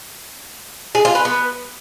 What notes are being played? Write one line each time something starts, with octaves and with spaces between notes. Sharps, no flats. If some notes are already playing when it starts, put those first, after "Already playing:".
G#4
F4
B4
B3